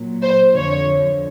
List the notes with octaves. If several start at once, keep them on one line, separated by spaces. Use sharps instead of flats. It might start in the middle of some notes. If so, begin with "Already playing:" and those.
Already playing: A#2 F#3
C5
F2 D3 F3 C#5